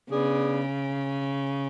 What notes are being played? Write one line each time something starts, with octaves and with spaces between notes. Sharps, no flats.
C#3 B3 D4 G#4